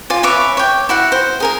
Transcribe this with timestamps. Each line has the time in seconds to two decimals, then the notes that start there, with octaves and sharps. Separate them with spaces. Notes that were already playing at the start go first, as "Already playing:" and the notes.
0.10 F4 D5 G#5
0.23 B4 C#5 E5 D6
0.57 C#5 G5
0.89 E4 F#4 F#5
1.12 C5
1.40 G#4 A#4 G#5